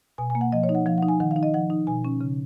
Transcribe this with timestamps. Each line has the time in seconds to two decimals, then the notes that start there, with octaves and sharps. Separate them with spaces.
0.18 B2 G#5
0.30 G#5
0.35 A#3
0.41 F#5
0.52 F3 D#5
0.64 C#5
0.69 D#4
0.75 F#5
0.86 F3 F5
0.98 D#4 F#5
1.08 G#5
1.20 D#3 F#5
1.31 F5
1.36 D#4
1.43 D#5
1.54 F3 F#5
1.70 D#4
1.87 B2 G#5
2.05 C#4
2.21 C#3